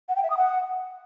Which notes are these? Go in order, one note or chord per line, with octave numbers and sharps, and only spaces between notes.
F#5
G5
E5
D#6
F#5